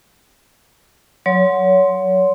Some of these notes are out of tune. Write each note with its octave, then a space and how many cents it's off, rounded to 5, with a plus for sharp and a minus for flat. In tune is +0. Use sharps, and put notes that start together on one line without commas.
F#3 -10 C#5 +25 C6 +0